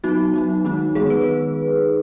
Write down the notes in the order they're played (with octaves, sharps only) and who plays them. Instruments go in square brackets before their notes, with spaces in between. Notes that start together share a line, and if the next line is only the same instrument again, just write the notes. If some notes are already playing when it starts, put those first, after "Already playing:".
[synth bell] F#3 B3 D#4 F#4
F#3 B3 D#4
D#3 G#3 B3 D#4
D#3 G#3 B3 D#4 G#4
B4